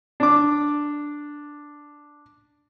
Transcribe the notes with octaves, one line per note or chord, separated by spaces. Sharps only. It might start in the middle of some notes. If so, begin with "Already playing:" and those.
D4 D6